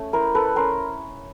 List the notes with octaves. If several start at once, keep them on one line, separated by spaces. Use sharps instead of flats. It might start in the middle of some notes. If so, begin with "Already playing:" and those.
Already playing: A3 C#4
E4 A#4 C5
A3 A4 B4
C#4 A#4 C5